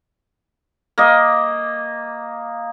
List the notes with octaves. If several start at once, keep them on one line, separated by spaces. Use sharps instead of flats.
A#3 D#5